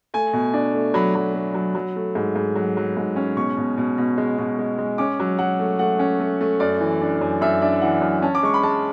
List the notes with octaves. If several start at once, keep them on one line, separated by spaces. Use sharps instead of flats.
A3 G#5
B2
D4
A3
F#3 B5
F#3
A3
F#3
F#3
A3
G#2
G#2
F#3
F#3
G#2
C#4
B2 C#6
B2
B2
B2
G#3
B2
G#3
G#3
C#4 D6
F#3
F#3 F#5
A3
A3 F#5
C#4
A3
A3
F#2 D5
E3
D4
F#2
F#2 E5
D4 E5
E3 F#5
F#2
C#4 A5
D6
G#3 C#6
B5
G#3 A5